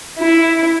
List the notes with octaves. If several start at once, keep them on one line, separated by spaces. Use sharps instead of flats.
E4